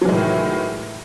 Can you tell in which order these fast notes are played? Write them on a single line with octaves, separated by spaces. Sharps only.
F#3 E3 G#3 A2 D#3